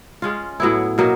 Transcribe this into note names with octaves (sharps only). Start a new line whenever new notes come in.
G#3 C#4 F4
A2 F#3 B3 E4
B2 F#3 A#3 D#4